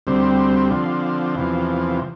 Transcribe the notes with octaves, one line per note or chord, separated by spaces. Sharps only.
D2 C3 G3 C4
D3 F3 C4
E2 C3 F3